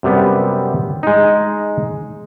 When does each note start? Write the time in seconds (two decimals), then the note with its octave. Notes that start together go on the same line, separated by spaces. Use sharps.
0.03 F#2 C3 G3 B3
1.03 G#3 D#4